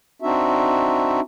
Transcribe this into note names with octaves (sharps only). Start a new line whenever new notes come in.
C4 D4 D#4 F#4 E5